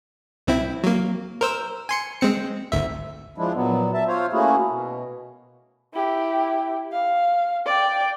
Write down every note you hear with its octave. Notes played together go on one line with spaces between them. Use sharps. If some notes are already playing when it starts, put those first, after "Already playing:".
C2 C4 E4
F#3 A#3
A#4 C5 E6
G#5 C6 C#7
G#3 C4 C#7
G#1 D2 E5
F3 G#3 D4 E4
A#2 F#3 B3
E5 A5
F4 C5 C#5 F5
A3 A#3 C#4 E4 F#4 G#4
B2
E4 G4
F5
D5 G5